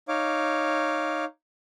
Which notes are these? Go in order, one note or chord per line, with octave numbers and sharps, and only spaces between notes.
D#4 C#5 F5 D6